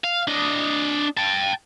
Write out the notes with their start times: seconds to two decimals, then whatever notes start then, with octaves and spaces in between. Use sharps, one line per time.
0.04 F5
0.28 D4 D#5
1.17 G5 A5